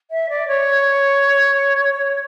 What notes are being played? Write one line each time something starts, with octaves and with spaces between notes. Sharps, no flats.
E5
D5
C#5